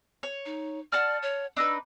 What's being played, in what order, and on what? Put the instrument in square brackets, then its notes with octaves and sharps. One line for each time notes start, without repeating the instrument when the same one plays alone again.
[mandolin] C#5
[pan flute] D#4
[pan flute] D5 [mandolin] F#5 A5 F6
[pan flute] C#5
[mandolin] D4 D#4 B4 [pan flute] E6